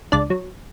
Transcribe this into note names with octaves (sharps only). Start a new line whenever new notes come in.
C#2 D4 D5
F#3